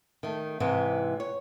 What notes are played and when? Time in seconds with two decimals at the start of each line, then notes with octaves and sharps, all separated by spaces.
0.23 D#3 A3
0.60 G#2 C3 E3 G#3
1.20 C#5